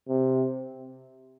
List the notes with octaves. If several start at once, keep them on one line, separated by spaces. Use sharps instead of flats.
C3